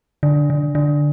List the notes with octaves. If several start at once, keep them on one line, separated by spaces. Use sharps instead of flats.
D3
D3
D3